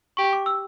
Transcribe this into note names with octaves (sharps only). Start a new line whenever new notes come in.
G4 C#6
D6
E6